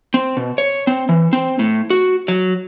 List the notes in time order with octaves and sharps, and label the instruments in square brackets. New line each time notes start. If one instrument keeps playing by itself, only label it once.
[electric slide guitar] C4
B2
C#5
C4
E3
C4
A2
F#4
F#3